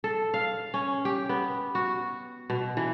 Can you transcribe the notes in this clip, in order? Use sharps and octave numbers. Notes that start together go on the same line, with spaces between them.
A4
F5
C#4
G4
B3
F#4
B2
E3